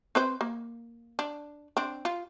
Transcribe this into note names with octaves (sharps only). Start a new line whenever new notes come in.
C4 B4 C5
A#3
D4
C4 D4
F4